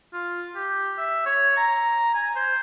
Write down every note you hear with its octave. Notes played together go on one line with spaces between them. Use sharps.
F4
G4
E5
C#5
A#5
G#5
C5